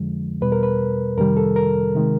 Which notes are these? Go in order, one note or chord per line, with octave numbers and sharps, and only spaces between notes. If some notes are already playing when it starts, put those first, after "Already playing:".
Already playing: F2 D3 F3 G#3
E2 B2 G3 B4
A#4
B4
F2 C3 D#3 G3 A#4
A4
A#4
C3 D#3 G#3